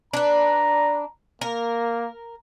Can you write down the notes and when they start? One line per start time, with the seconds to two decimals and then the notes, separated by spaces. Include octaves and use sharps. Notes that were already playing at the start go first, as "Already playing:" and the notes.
0.13 D4 B4 A#5
1.41 A#3 A#4